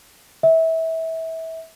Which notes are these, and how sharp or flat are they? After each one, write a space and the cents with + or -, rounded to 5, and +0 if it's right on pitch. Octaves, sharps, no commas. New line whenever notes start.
E5 -25